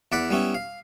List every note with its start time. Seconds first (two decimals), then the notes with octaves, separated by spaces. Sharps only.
0.12 E2 D5 F#5 B5
0.30 G3 B3 C#4 E4
0.54 F5